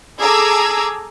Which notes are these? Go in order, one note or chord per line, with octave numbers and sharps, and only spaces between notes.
G#4 A4 A#5 D6 E6 G#6